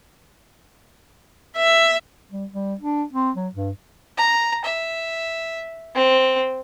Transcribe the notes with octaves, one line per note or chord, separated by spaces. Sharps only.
E5
G3
G3
D4
C4
F#3
G2
A#5
E5
C4